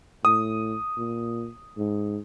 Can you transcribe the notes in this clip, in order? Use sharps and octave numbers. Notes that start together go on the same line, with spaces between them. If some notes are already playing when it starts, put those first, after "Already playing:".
A2 D#6
A#2
G#2